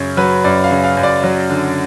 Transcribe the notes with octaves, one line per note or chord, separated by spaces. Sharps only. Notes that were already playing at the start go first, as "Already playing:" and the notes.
Already playing: F#2 C#3 C#5
F#3 B4
F#2 D5
F5
C#3
F5
F#2
D5
F#3
D3